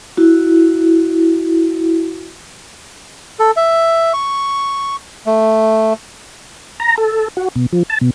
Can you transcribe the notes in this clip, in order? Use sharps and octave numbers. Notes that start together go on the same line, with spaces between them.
E4 F#4
A4
E5
C#6
A3
A#5
A4
F#4
B2
F3
A5
B2